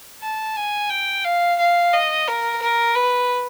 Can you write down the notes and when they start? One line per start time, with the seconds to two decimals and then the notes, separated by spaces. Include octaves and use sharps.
0.22 A5
0.56 G#5
0.90 G5
1.25 F5
1.59 F5
1.93 D#5
2.28 A#4
2.62 A#4
2.96 B4